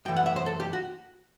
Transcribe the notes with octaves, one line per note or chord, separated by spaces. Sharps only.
F#2 E3 A3 G5
F#5
E5
C5
A4
G4
F#4